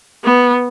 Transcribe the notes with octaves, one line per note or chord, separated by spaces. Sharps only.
B3